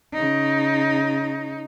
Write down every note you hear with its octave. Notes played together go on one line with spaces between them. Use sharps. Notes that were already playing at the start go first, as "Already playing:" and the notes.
C#3 D#4